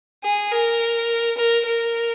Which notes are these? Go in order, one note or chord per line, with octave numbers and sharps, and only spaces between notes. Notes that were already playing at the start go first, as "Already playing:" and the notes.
G#4
A#4
A#4
A#4